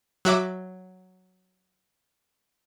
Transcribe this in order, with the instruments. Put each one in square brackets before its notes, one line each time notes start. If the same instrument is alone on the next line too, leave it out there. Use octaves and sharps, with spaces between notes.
[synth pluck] F#3 F#4 E5 D6